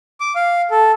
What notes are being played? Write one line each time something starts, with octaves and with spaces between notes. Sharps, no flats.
D6
F5
A4